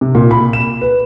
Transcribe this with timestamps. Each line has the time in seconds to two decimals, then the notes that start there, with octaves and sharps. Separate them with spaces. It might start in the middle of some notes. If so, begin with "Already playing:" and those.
0.01 C3
0.15 A#2
0.31 B5
0.53 E7
0.81 B4